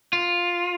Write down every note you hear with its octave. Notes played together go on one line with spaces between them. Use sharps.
F4